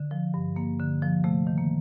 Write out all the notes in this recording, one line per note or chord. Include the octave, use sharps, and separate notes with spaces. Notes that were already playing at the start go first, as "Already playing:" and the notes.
Already playing: D3
F3
G2
G2 A#3
D3
F3
C3 A3
D#3
A#3